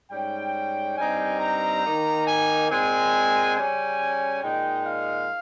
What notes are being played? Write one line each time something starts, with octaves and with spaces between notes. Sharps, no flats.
G#2 G3 C#4 G5
G2 G3 C4 D#4 G#5
A#5
D#3 A#3 D#4
G#5
A#2 G#3 C4 G#5
C#3 G3 C#4 G#5
A#2 G#3 D#4 G5
F5